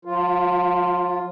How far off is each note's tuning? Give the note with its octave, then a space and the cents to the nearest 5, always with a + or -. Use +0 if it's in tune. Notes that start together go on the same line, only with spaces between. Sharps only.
F3 +45 F4 +0